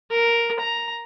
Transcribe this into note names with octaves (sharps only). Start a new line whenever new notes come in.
A#4
A#5